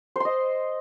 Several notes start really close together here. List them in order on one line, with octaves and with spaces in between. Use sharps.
C5 C6 D#5